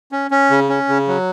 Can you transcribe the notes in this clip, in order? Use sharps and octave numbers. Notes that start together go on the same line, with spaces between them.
C#4
C#4
C#3
C#4
C#3
F#3